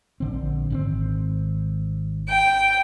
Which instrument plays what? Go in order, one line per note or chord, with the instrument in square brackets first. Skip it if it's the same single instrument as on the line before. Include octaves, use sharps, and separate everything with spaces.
[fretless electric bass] A#1 D3 C4
G#1 C3 C4
[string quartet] G5